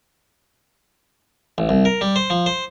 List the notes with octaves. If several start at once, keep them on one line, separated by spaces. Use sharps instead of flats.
A1
C2
A#4
G3
C5
F3
C5